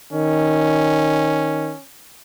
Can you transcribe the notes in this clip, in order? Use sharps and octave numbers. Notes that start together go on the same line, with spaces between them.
D#3 C#4